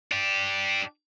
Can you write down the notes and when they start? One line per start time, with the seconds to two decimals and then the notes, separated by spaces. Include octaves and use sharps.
0.12 D4 G4